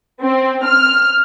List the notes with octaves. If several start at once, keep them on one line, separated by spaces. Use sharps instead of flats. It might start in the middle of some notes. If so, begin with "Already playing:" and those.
C4
F6